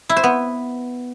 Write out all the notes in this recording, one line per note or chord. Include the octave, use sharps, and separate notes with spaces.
E4
C5
B3